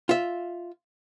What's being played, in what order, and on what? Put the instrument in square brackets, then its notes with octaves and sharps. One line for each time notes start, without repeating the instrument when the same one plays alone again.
[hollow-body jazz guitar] F4 E5